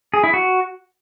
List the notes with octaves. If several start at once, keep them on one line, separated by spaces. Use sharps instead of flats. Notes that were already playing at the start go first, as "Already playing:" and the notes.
G#4
E4
F#4